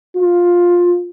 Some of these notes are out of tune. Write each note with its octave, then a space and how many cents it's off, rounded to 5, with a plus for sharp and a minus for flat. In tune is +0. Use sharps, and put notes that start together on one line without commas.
F4 +10